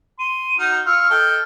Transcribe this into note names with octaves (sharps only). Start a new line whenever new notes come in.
C6 D#7
D#4 F#4 F6
F4 C#6 E6 F6
A4 D#5 G5